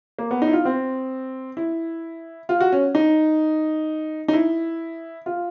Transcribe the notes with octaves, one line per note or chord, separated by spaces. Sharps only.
A#3
B3
D#4
E4
F4
C4
E4
F4
F#4
C#4
D#4
D#4
E4
F4